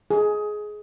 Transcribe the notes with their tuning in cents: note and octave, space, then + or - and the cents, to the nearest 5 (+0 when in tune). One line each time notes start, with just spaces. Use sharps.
G#4 +15